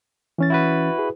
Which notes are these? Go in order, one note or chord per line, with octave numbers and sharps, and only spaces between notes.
E3 C#4 A6
E4 F#4 B4
G#4